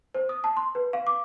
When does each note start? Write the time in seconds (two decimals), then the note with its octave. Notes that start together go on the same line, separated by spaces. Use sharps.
0.14 C5
0.29 D#6
0.44 A5
0.57 C6
0.75 B4
0.93 F5
1.07 D6